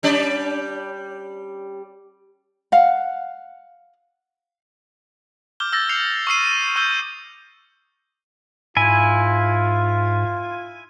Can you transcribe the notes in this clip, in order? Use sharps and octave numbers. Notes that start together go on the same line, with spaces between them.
G3 C#4 D5
F5 F#5
D6 F6 G6 G7
E6 G6 A6 A#6
G6 C7 C#7 F7
C#6 D#6 E6 C7 D#7
C#6 E6 F6 G6 D#7 G7
G#2 E4 F4 G#5